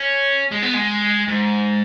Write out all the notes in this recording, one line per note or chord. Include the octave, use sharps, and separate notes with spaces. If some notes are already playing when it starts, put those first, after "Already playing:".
Already playing: C#4
G#3
B3
G#3
G#2